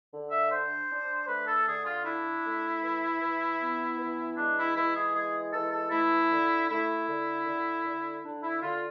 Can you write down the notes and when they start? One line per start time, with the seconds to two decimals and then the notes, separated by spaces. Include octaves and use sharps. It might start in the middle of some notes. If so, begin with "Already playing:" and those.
0.12 D3
0.31 E5
0.50 D4 C5
0.89 D4
1.28 A3 B4
1.47 A4
1.66 D3 G#4
1.86 F4
2.05 D4 E4
2.44 A3
2.82 E3
3.21 E3
3.60 B3
3.98 E3
4.37 G#3 D4
4.56 E4
4.75 E3 E4
4.95 G#4
5.14 G#3 G#4
5.52 E3 A4
5.72 A4
5.91 A3 E4
6.30 D3
6.69 A3 E4
7.08 D3
7.46 D3
7.84 D3
8.23 D3 D4
8.43 E4
8.62 D3 F4